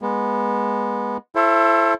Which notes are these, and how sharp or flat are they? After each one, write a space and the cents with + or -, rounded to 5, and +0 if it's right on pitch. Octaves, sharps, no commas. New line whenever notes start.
G#3 -10 B3 -20
E4 +30 A4 -5 C5 +35